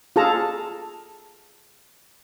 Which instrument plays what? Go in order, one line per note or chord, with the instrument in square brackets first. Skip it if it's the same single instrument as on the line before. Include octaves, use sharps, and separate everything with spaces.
[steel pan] F4 G#4 A4 A5 A#5